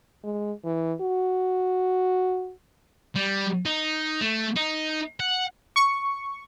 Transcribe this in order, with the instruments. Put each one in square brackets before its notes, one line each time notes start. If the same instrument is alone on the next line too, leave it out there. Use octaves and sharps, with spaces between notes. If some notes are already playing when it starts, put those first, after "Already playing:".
[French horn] G#3
E3
F#4
[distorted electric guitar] G3
D#4
A3
D#4
F#5
[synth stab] C#6